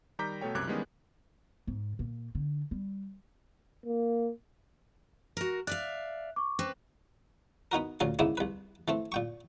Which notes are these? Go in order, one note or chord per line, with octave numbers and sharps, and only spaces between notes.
D#3 G3 A#5 D6 G6 B6
B2 A3 A4 C#5 G5
C2 F#2 C3 D6 F#6 G#6
D#3 E3 G3 G#3 B3 C#4
G#2
A#2
D3
G3
A#3
F#4 A#4
D5 E5 F5 F#6
C#6 D6
C4 B4
B3 D#4 F#4 A#4
D2 A#2 F#3 C#4 F5
G#2 C#3 A#3 B3 E4
C2 B4
E3 A3 C4
A#2 G5 C#6